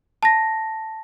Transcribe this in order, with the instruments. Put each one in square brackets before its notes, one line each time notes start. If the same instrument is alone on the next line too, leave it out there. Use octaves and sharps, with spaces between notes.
[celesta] A5 A#6